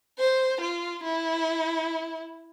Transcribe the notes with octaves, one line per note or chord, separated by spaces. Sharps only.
C5
F4
E4